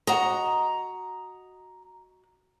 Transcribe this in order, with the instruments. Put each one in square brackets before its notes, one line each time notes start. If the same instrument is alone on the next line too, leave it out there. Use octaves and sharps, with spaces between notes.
[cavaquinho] F#4 D#5 [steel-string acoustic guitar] A#5